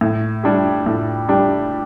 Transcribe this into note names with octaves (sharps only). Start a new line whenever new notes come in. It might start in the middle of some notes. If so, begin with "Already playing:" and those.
A2
G3 D4 G4
A2
G3 D4 G4